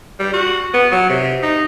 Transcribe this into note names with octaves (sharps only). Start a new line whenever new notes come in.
G3
F#4
B3
F#3
C3
D#4